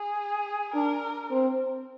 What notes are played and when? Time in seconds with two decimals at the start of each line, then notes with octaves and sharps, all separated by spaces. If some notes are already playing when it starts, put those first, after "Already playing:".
Already playing: G#4
0.74 D4 A#4
1.31 C4